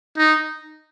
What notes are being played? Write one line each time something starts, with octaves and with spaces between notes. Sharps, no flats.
D#4